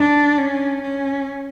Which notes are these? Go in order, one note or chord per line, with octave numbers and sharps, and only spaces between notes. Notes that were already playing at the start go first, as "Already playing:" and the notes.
Already playing: D4
C#4
C#4